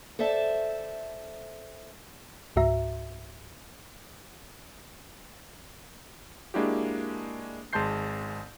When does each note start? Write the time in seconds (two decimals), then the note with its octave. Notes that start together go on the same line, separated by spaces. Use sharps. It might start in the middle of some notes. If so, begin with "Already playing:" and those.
0.19 A4 C5 D5 E5 A5
2.56 C#2 G#2 F#4 E5 A#5
6.54 G#3 A#3 D4 E4 F#4 G4
7.73 G#1 G#3 A5 C6 G6 C7